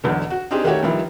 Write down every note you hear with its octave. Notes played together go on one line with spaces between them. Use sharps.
B1 E2 D3
F#4
C4 D4 D#4 G4 G#4
D#3 A3 F#4 G4 C#5
G2 D#3 F3 G3 E4